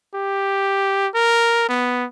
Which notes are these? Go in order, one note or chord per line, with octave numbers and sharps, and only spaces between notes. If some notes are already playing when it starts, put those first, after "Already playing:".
G4
A#4
B3